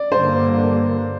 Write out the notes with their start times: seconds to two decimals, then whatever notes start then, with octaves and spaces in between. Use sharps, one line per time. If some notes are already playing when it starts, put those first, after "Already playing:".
Already playing: D5
0.12 G2 D3 G3 A#3 C5